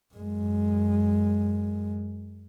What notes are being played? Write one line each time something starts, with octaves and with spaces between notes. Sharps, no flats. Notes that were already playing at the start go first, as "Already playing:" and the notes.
F#2 G#3